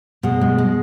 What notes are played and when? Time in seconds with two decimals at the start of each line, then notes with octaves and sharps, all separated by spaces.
0.23 B2 G#3
0.41 G#3
0.58 G#3